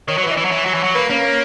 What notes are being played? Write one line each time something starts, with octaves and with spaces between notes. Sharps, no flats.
D#3 C#5
F#3
E3 B4
D#5
E3 C#5
F#3
E3
F#3
E3
F#3
A#3 B4
A#3 C#4